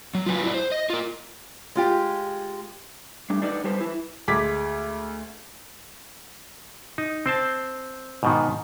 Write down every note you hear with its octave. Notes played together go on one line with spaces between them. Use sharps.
F#3
F4 F#4 B4 G5 G#5
F#3 E4 C#5 D5
C5
D#5
F4 A#4
G#3 F4 G4
G3 A3 D4
D4 D#4 A4 B4 D5
G3 G4 A4 B4 C5
E4 B4
D2 G#3 D6 G#6 B6
D#4
C4 C5 A5
G#2 B2 D#3